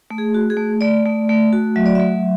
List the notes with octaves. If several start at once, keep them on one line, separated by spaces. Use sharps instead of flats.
A3
G#4
F#4
G#4
A3
A3 D5
A3
A3
F#4
F#3 E5
D5
A3 E5